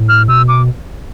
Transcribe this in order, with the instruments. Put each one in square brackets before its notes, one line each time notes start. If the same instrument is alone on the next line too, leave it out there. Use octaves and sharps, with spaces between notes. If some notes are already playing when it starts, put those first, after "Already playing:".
Already playing: [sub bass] A2
[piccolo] F6
[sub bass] B2 [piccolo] E6
[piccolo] D6